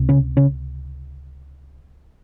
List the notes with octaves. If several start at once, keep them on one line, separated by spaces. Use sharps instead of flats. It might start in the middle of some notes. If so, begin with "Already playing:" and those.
Already playing: C#2 C3
C#3 C#4
C#3 C#4